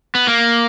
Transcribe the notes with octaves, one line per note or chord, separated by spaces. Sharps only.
B3
A#3